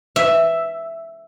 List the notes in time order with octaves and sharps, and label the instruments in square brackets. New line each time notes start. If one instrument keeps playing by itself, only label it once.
[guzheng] E5